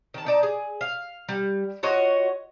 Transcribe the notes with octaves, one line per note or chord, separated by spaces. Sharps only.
D#3 A5
D#4 D5 A5
G#4
F5
G3
F4 F#4 C#5 D#5